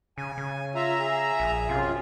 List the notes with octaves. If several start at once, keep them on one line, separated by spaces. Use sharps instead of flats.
C#3 G#5
C#3
F4 E5 A#5
G#4
A#1
F#2 C3 F4